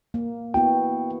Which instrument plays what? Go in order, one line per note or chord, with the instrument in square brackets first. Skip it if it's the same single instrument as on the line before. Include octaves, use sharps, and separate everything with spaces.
[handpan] A#3
[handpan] B3 E4 F#4 [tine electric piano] G5